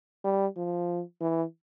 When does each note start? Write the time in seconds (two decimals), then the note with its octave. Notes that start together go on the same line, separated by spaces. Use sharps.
0.24 G3
0.57 F3
1.21 E3